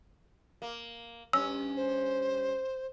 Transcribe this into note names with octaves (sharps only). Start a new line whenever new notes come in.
A#3
G2 C#4 E6
C5